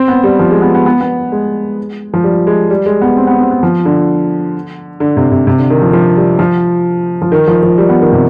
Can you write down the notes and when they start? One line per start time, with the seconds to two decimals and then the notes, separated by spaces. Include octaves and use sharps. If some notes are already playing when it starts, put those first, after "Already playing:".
Already playing: C4
0.08 B3
0.23 G3
0.39 F3
0.51 G#3
0.62 B3
0.75 B3
0.86 B3
1.01 B3
1.32 G#3
2.14 F3
2.24 G3
2.47 G#3
2.70 G3
2.86 G#3
3.01 B3
3.16 C4
3.27 B3
3.40 C4
3.51 B3
3.63 F3
3.85 D3
5.00 D3
5.17 C3
5.32 C3
5.47 C3
5.58 D3
5.70 D#3
5.82 F3
5.93 F3
6.17 G3
6.39 F3
7.22 F3
7.32 D#3
7.47 F3
7.63 F3
7.78 G3
7.89 B3
8.01 D#3
8.12 C3